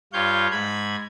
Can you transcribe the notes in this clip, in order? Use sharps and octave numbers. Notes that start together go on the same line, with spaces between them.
G2 F4 C#5 F5 G6
G#2 B5 G#6